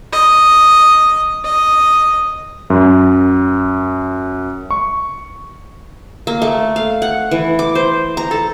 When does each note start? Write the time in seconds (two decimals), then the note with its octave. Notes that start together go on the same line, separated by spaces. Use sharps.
0.13 D#5
1.45 D#5
2.70 F#2
4.71 C#6
6.27 A#3
6.42 A3
6.76 F5
7.02 F#5
7.31 E3
7.59 D6
7.75 C5
8.17 A#5
8.31 A4